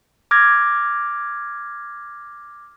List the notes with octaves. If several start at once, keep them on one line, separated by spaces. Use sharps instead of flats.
D6 F6 G#6 A#6